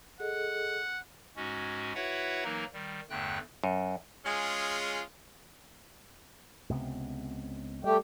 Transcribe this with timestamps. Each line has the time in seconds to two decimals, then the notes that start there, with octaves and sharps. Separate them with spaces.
0.20 G#4 A4 D#5 F#5
1.36 G#2 G#3 C#4 F#4
1.95 E4 F#4 B4 C#5 E5 F#5
2.44 E3 F#3 A#3 D#4 A#4
2.73 D#3 G3
3.10 E2 G2 D3 A3 G5 F#6
3.64 F#2
4.25 G#3 C#4 F4 G#4
6.69 C#2 C3 B3
7.84 G3 A3 G4